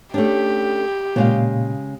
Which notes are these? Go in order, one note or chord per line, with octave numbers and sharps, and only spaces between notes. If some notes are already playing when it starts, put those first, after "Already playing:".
A3 C#4 D4 G4
A#2 C#3 G#3 F5